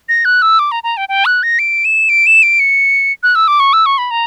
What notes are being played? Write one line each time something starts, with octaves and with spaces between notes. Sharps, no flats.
A#6
F#6
E6
D6
A#5
A#5
G5
G5
F#6
A#6
D7
E7
D7
E7
D7
C#7
F#6
E6
D6
C#6
E6
C#6
B5
A#5